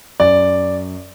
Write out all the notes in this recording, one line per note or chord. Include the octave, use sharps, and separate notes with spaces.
F#2 D5